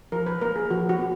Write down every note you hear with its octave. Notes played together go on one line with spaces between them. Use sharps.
F3 A#4
B4
A#3 A#4
G#4
F3 F#4
F#4
B3